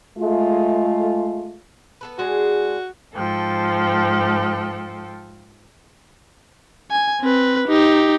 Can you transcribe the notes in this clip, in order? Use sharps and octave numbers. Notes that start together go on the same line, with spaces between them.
G#3 A3 F4
B3 A4 B4
G#3 D4 F#4 G#4
G#2 F3 A4 G5
G#5
C4 B4
D#4 G4